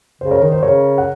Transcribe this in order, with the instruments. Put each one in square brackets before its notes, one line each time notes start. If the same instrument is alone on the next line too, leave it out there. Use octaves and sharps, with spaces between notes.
[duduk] C#3 [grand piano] C5
[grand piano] A#4 C#5
[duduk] D#3 [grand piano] A#4
[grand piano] C5
[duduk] C#3 [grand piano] A#4 C#5
[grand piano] F#5